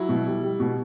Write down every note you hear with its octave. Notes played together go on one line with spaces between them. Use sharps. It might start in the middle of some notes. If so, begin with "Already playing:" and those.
Already playing: F#3 E4
B2
G3
G3
B2